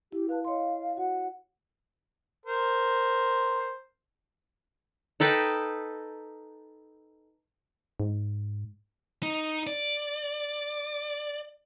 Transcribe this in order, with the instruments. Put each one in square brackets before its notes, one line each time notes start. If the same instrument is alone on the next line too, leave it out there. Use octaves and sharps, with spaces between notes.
[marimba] E4 [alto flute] G4
[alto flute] B4 [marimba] F5 A5
[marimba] C#5 D#5 C6 [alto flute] F5
[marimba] F#4 [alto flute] F#5
[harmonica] A#4 C5
[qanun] D#4 A4 B4 G5
[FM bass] G#2
[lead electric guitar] D#4
D5